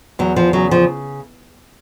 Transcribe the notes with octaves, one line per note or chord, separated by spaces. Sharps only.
E2 F#3
F3
C#3 F#3
F3